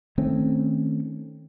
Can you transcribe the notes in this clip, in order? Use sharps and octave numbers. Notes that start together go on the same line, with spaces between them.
D#3 A3 C4 C#4